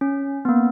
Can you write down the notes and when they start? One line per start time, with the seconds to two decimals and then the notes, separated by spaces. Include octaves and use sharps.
0.01 C#4
0.45 B3
0.49 A#3